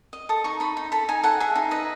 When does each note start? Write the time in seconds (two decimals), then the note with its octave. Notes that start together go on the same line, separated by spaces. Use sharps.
0.13 D#5
0.29 A4 D#6
0.44 D#4 C#6
0.60 D#4 B5
0.77 D#4
0.92 A4 B5
1.09 D#4 G#5
1.24 A4 F#5
1.40 G#4 E5
1.56 D#4
1.71 B4 D#5